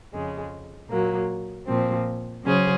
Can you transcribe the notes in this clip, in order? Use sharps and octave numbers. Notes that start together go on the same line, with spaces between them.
F2 C#3 G#3
A#2 F#3 A#3
A#2 F3 C4
C#3 F#3 C#4 G#4 C5